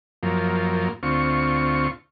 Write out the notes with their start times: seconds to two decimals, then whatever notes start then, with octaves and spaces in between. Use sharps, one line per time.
0.23 F#2 F3 A#3
1.03 D2 C4 F4 C#6